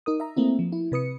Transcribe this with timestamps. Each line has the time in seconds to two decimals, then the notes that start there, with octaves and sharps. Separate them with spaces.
0.06 D#4 A#4 D#6
0.20 E5 A#5
0.37 A3 A#3 C4 E4
0.59 F3
0.72 E4
0.92 C3 B4 D#6 C#7